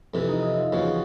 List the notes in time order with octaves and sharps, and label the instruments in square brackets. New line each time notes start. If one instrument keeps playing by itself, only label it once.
[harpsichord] F2 C3 E3 [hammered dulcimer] E4
[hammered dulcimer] D#4
E4
F4
[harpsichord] E2 C#3 F3 [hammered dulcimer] F#4
[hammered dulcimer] F#4